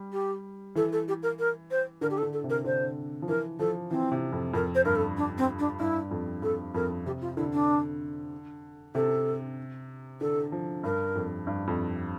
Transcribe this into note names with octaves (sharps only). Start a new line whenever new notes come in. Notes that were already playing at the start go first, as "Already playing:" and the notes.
Already playing: G3
G4
E3 A4
A4
G4
A#4
A#4
C5
D3 A#4
G4
A4
D3
A4
C3
A#4
D3 C5
F3
E3 A#4
F3 A4
E3 C4
C3
F2
F2 A#4
C5
G2 A#4
A4
D4
C4
D4
G2 E4
F2
F2 A4
F2 A#4
C3 G4
F4
D3 E4
D4
C3 A4
D3 A4
F3
G2 A#4
F2
G2
F2